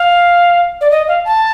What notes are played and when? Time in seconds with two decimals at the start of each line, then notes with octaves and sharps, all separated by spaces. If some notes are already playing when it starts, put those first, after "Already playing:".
Already playing: F5
0.81 D5
0.91 D#5
1.08 F5
1.25 A5